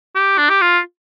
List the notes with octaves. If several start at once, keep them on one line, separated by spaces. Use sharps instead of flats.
G4
D4
G4
F4